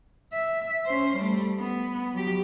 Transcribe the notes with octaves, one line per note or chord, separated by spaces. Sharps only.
E5
C#4 C5
G3 A3
B3
F#3 G4